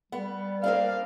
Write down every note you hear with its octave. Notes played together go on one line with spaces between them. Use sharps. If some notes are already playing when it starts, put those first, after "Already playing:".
G3 B3
A#3 C4 D4 F5